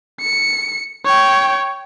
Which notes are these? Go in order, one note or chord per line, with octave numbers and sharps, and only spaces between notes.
C#7
C#5 G5